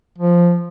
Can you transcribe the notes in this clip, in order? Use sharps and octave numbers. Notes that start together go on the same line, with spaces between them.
F3